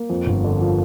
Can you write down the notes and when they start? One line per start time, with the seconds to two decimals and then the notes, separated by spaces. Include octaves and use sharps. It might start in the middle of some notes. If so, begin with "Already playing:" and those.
Already playing: A#3
0.10 F2
0.26 G1
0.44 D3
0.61 F3